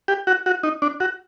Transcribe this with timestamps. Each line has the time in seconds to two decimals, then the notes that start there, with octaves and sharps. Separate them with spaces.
0.08 G4
0.27 F#4
0.46 F#4
0.63 D#4
0.82 D4
1.00 F#4